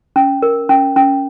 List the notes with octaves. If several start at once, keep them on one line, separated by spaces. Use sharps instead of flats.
C#4
A#4
C#4
C#4